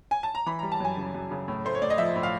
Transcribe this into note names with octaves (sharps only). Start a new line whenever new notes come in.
G#5
A5
A#5
E3 B5
G3 A#5
A5
F#2 G#5
C#3
F#2
C#3
A2
A3 C5
C#5
A2 D5
D#5
F3 E5
A2
F5